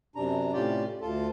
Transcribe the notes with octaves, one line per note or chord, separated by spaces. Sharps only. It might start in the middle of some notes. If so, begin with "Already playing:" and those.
F#2 C3 D4 A#5
A2 C3 C#4 F4 G4 D5
D2 F4 A4